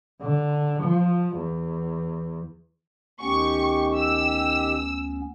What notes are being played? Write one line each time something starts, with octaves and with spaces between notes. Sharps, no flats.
D3
F3
E2
D2 D#3 B3 C#4 G4 C#6
E6